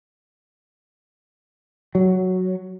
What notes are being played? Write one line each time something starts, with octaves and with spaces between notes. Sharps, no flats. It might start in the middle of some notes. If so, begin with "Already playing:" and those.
F#3